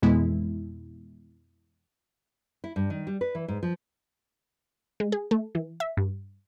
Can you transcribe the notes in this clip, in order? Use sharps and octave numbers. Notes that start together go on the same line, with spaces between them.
F2 B2 E3 G#3 B3 E4
E4
G2
D#3
G3
B4
E3
G#2
F3
G#3
G#4
A3
E3
E5
G2